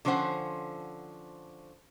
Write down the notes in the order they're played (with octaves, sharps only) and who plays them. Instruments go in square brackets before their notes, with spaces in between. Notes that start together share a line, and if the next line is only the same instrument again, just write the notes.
[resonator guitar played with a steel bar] D3 F3 C#4 C5 F#5